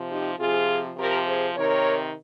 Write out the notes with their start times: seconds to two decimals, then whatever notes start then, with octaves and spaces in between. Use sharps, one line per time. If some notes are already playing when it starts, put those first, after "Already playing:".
Already playing: C3 F3
0.10 D#4 G4
0.39 C3 F3 F4 G#4
0.97 C3 F3 G4 A#4
1.26 G#4 C5
1.56 C3 D#3 A#4 C#5